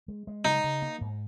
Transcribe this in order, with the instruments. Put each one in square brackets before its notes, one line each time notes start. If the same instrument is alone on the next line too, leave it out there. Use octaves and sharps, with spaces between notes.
[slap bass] G#3
G#3
[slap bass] C#3 [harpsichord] D#4
[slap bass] C#3
A#3
G#2